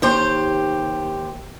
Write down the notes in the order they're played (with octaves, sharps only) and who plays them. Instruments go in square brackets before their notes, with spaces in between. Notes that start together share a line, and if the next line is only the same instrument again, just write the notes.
[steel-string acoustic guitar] D#2 G4 C5